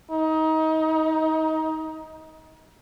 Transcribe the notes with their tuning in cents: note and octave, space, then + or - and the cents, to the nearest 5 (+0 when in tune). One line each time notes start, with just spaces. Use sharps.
D#4 +25